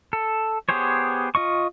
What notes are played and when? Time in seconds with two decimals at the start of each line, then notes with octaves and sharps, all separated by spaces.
0.13 A4
0.69 B3 G4 G#4 C5 C#5
1.35 F4 D#5 C#6